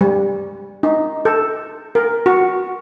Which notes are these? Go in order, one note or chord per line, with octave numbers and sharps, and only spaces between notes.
G3
D#4
A4
A#4
F#4